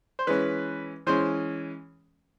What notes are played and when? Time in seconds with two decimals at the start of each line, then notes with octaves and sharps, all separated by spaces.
0.19 C5
0.27 E3 G#3 C#4 B4
1.07 E3 G#3 C#4 C5